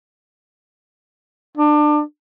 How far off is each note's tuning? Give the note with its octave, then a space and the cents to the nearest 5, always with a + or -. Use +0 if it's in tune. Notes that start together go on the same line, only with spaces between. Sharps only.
D4 +25